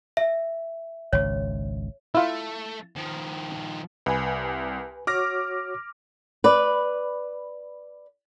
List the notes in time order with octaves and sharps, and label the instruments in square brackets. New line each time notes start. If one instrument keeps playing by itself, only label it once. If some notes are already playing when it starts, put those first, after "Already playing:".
[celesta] E5
[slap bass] G#1 C#2 [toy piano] C#5
[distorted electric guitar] A3 [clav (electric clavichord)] E4 F4
[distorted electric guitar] D#3 F3
[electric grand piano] C2 [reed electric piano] B4 G#5
[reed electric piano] F#4 C#5 [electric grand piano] D6 F6 A#6
[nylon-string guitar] B4 D5